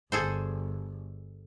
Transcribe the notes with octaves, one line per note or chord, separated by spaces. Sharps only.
G1 G#4 A4 C5